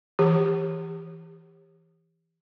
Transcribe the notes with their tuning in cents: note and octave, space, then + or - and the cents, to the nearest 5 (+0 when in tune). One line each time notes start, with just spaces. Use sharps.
E3 +0 G4 +25